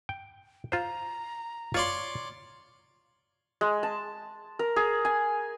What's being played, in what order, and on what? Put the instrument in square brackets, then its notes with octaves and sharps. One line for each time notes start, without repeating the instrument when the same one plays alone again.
[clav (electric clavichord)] G5
[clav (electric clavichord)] F4 C5 [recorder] A#5
[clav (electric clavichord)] F4 [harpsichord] C#5 D5 C6
[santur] G#3
A5
A#4
G#4
G#5